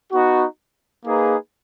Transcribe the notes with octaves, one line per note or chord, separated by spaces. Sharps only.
B3 D#4 F#4
A#3 D#4 G#4 B4